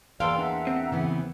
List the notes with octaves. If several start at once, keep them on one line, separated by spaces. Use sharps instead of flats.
E2 A#3 D5 F5 G5 C6 E6
D4 E5 F#5 A#5
C4
C#3 E3 B3